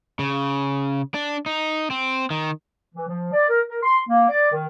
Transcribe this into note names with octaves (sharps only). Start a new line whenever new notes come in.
C#3
D4
D#4
C4
D#3
E3
F3
D5
A#4
A#4
C6
A#3
D5
D#3